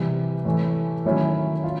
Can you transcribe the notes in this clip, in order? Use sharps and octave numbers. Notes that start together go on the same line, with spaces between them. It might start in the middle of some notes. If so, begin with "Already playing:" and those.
Already playing: C3 E3 G3
A2 E3 A3
D#3 F#3 A3 C#4 E4
F4